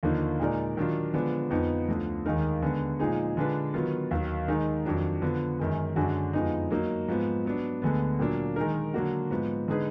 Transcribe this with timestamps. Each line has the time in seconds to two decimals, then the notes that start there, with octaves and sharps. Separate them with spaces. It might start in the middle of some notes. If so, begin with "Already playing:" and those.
0.03 D#2 D3 F3 A#3 D#4
0.40 A#2 G#3 D#4 A#4 D5
0.77 D#3 F#3 D4 F4
1.14 D3 F3 G#3 B3 D4
1.50 F2 F3 B3 D#4
1.88 D2 D3 F3
2.25 D#2 D#3 G#3 D#4 A#4
2.62 D3 G#3 B3
3.00 A#2 F3 G#3 D#4 G#4
3.37 D3 G#3 D4 F4 B4
3.74 D#3 F#3 B3 F4
4.11 D#2 D#3 F#3
4.48 D#3 G#3 D#4
4.86 F2 D#3 F#3 D4
5.22 D3 F3 B3
5.59 F#2 D#3 G#3
5.96 F#2 D3 G#3 D4 F#4
6.33 F2 F3 G#3 B3 D#4
6.70 F#3 A#3 D#4
7.08 G#2 F3 B3
7.45 F#3 B3 D4
7.82 D2 D3 G#3 B3
8.19 A#2 F#3 A#3 D4
8.56 D#3 G#3 D#4 A#4
8.94 D3 F#3 A#3 D4 F#4
9.31 G#2 F3 B3
9.68 D3 G#3 D#4 G#4 B4